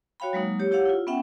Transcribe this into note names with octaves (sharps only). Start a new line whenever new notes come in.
F#4 C#5 F5 G5 B5
F#3 G#3 A#3 D#4
G4 C#5
E4 G4 C#5 F5 F#5
E4 F4
B3 C#4 E5 F#5 G5